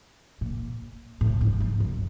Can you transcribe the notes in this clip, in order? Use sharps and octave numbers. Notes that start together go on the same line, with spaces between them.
A#2
A2
G#2
G#2
F#2